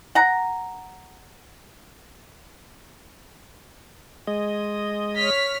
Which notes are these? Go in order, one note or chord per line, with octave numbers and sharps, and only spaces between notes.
F#5 A#5
G#3 D#5
C#5 F6 B6